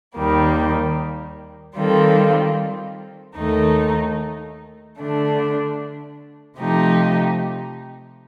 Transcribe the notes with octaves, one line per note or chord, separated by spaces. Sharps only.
D#2 D#3 G3 A#3
D#3 G3 C4 F4 A4
D#2 D#3 A3 D#4 A4
D3 A3 D4
C3 F3 A3 D#4 G4